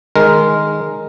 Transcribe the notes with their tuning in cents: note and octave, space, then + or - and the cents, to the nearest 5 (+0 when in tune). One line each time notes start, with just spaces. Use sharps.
D#3 +0 G#3 +0 A#4 +0